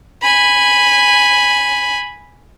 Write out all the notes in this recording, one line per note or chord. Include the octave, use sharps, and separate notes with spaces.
G#5 B5